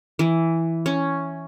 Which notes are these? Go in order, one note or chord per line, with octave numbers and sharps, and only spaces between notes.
E3
C#4